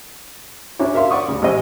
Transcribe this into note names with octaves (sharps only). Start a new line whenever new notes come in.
C#4 D4 E4 F#4 C#5
A#4 E5 F5 C6
D5 F#5 C#6 D#6
D2 C#3
A1 G#3 C#4 C5 D#5